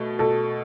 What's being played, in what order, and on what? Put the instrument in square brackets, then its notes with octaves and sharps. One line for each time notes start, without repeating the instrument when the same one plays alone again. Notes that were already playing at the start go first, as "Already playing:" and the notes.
Already playing: [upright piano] B2 A3
[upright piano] B2 [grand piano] A4